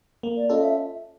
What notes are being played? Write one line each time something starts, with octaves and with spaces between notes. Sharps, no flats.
A#3
D5
C#4 F4 A4 D#5
E5